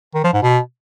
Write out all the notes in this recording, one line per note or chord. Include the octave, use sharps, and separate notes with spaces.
D#3
F3
G#2
B2